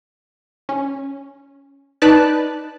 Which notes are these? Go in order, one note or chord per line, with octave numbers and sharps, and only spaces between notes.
C#4
D#4 B4 D5 A5 F#6